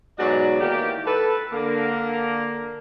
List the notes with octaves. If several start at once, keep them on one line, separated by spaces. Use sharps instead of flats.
G#2 B2 F#3 F#4 D5
D#3 E3 A#3 G4
A4 B4
D3 A#3